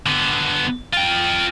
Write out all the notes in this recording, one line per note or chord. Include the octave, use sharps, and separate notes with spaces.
D3 B3
F4 G5